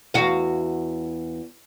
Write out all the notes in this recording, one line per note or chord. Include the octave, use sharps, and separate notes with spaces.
E2 F#4 F5